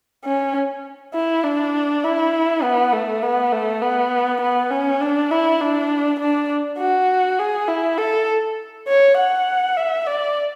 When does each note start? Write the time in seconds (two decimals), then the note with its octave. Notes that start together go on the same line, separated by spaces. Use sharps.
0.25 C#4
1.14 E4
1.44 D4
2.04 E4
2.63 B3
2.93 A3
3.23 B3
3.52 A3
3.81 B3
4.41 B3
4.71 C#4
5.01 D4
5.31 E4
5.60 D4
6.20 D4
6.79 F#4
7.39 G#4
7.68 E4
7.98 A4
8.88 C#5
9.17 F#5
9.77 E5
10.07 D5